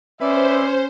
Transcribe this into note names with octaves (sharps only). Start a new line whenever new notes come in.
C#4 B4 C5 D5 E5